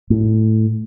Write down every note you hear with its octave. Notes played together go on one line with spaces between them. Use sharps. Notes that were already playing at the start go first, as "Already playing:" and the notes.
A2